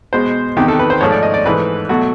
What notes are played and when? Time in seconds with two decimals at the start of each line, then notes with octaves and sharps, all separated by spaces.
0.13 B2 G#3 C5
0.57 E2 C3 D#3 G4
0.68 A4
0.79 B4
0.90 C5
1.01 G#2 F3 A3 C#5
1.12 D5
1.23 D#5
1.34 D5
1.46 G#2 E3 A3 B4
1.89 B2 F#3 A3 F#4